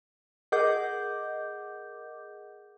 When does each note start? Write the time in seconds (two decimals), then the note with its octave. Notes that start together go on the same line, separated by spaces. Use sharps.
0.52 G#4 A#4 D#5 F#5 D6 G6